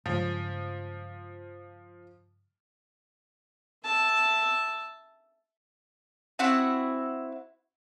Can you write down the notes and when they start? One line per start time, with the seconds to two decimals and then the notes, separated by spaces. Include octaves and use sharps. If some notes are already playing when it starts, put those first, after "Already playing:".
0.06 G2 C#3 F3 G#3
3.84 E5 A5
6.39 C4 E4 F#4 F#5